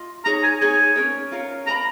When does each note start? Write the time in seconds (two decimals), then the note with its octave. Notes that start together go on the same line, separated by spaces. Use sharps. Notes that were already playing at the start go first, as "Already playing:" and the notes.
Already playing: F4 D#5
0.25 D#4 G#4 C#5 A#5
0.43 G#5
0.61 D#4 G#4 C#5 G#5
0.96 C#4 F4 A#4 C#5
1.32 C#4 F4 A#4 C#5
1.67 A#4 D#5 G#5 A#5 B5